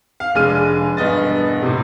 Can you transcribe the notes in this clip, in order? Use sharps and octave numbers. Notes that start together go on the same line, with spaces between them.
F5
F1 G#3 D4 F6 D#7
E1 G2 B3 D#5 A6
A2 C3